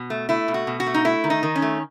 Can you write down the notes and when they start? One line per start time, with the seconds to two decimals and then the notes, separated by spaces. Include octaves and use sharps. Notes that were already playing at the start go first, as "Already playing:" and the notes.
Already playing: B2
0.10 A3
0.29 A3 E4
0.48 B2
0.54 F#4
0.67 B2
0.80 F#4
0.87 A3
0.94 D#4
1.05 A3 E4
1.24 D#3
1.30 D#4
1.43 D#3
1.56 C#4
1.62 A3